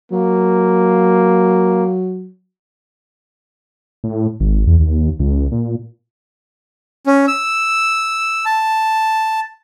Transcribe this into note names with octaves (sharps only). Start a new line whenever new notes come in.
F#3 A#3
A2
G#1
E2
D#2
C#2
A#2
C#4
E6
A5